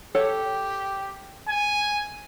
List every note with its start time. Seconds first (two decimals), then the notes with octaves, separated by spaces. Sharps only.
0.15 G4 A4 C#5 F#5
1.49 G#5